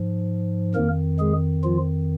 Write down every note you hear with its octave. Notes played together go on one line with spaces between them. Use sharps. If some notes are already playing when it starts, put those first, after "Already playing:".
Already playing: G#2 F3
F2 D#3 A#3 A#4
G#3 G#4
F3 F4